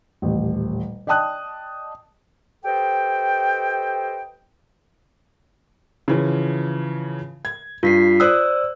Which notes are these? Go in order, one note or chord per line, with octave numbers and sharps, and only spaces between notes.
D#1 A1
D5 D#5 G5 A5 D#6 F#6
G4 A4 B4 C5 D#5 G5
C#3 E3 F3
G#6
G2 F4 B6 C7
C5 D5 D#6 E6 F#6